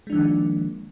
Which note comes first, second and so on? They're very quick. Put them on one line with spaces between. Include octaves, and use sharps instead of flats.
G#3 D4 F3 D#3 A#3